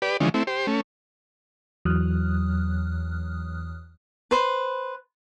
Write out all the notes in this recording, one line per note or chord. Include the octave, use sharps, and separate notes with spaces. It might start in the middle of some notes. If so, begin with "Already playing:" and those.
G4 B4 D5
D3 E3 F3 G#3 C#4 D#4
A3 C4 E4
G4 C5
A3 C#4
E2 E3 F#3 D#6 F6 F#6
B4 C5